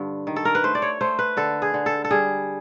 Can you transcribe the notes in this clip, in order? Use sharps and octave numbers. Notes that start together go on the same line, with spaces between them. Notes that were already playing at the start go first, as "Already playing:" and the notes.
Already playing: G2 D3
D#3
A4
A#4
B4
A3 C5
D5
C#5
A3 C5
B4
D3 A4
G#4
D3
A4
A4
G3 G#4